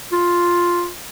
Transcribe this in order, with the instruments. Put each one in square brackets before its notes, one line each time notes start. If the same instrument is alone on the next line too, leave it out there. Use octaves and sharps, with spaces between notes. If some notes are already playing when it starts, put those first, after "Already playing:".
[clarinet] F4